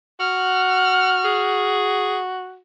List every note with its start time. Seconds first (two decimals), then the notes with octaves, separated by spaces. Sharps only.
0.20 F#4 F#5 F6
1.24 G#4